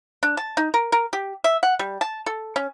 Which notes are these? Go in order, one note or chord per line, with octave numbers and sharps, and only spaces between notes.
D4
A5
D#4
A#4
A#4
G4
E5
F#5
G3
A5
A4
C#4